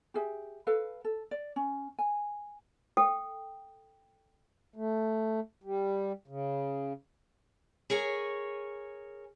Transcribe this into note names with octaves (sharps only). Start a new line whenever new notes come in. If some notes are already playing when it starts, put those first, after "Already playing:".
G4 G#4 E5
A4 B4 F5
A4
D5
C#4
G#5
A4 G5
A3
G3
C#3
G#4 A#4 C#5 G#5